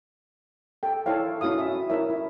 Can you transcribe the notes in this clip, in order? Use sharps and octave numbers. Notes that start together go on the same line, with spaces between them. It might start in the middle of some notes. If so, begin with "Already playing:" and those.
A4 G5
E4 A4 C#5 F5
C#4 E4 F#4 F5 D#6
E5
E4 A#4 C#5 E5
E4